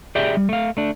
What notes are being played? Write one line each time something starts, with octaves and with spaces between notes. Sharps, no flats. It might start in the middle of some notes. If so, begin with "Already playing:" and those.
G4 G#4 D5 E5 G5
G3
A3 F5
A3 D4